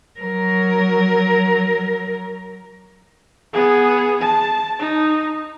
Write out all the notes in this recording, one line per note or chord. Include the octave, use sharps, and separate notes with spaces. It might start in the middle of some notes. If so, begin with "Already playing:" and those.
F#3 A#4
B3 G#4
A5
D#4